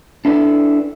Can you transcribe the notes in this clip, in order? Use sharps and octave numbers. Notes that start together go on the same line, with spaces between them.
D4 E4 A4 B4 D5